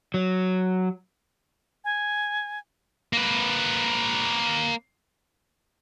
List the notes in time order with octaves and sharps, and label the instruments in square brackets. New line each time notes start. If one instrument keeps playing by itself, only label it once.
[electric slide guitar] F#3
[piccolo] G#5
[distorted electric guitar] A#3 B4